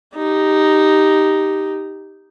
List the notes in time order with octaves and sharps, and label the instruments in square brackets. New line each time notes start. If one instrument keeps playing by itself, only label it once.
[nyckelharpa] D#4 G4